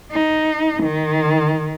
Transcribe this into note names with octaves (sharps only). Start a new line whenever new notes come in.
D#4
D#3